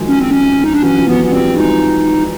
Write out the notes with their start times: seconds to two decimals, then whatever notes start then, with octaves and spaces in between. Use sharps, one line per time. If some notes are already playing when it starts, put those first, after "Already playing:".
Already playing: D#3 F3 F#3 G#3
0.09 C#4
0.19 C4
0.31 C#4
0.64 D#4
0.74 D4
0.83 E3 F#3 C#4
0.98 F3
1.07 E3 F#3 B3
1.24 B3
1.32 F3 G3 C4
1.56 F#3 G#3 D#4